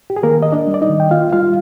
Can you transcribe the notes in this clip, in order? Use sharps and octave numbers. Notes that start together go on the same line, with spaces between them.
G4
G#4
D#3 A#3 A#4
A#3 D#5
D4 D5
G3
D5
D#4 D#5
D#3
G5
A#3 F4 F5
G3 F4 F5